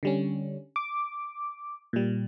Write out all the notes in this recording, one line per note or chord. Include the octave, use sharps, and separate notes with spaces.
D3 G3 C#4
D6
A#2 G3